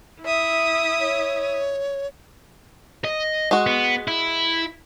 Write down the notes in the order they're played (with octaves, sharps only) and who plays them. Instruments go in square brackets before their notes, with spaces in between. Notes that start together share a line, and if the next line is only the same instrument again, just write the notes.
[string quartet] E4 E5 D#6
[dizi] C#5
[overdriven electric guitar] D#5
[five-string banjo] G#3 F#4
[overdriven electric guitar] B3
E4